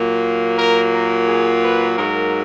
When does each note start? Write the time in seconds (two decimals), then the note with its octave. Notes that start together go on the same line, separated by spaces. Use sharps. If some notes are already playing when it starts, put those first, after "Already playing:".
Already playing: A#2 F#3 A#3
0.58 A#4
0.93 A#4
1.27 G#4
1.63 B4
1.97 G#2 F#3 A#3 A#4